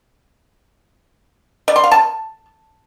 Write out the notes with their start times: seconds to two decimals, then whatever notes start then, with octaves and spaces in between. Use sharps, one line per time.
1.68 D5
1.76 C6
1.84 F5
1.92 A5